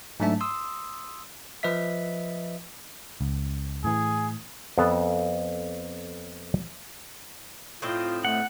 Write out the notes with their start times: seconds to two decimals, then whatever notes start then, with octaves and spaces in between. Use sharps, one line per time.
0.20 G#2 F#3 A3 D4 E5 A5
0.41 C6 D#6 E6
1.63 F3 B4 D#5 E5 B6
3.21 C#2
3.84 A2 E3 G#4
4.78 F2 B3 A4 A5
7.82 A2 C4 F4 D#5
8.25 A3 F#5